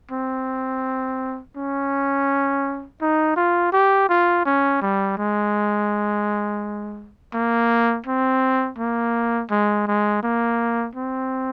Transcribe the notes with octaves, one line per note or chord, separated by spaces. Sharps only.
C4
C#4
D#4
F4
G4
F4
C#4
G3
G#3
A#3
C4
A#3
G#3
G#3
A#3
C4